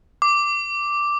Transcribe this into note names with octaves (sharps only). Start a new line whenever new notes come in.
D6